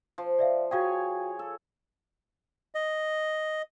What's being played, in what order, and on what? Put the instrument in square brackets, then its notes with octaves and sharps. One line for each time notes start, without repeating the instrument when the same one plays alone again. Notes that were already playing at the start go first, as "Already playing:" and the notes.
[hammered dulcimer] F3
[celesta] D5 E5 F5
[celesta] F#4 F5 G5 [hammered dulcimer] G#4 C#5 G#5
[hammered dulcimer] A4
[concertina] D#5